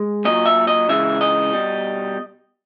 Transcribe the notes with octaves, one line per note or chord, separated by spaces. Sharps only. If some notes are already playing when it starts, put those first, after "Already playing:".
Already playing: G#3
A#2 F#3 D#5
E5
D#5
C#3 E3 G#3 E5
D#5
B2 G3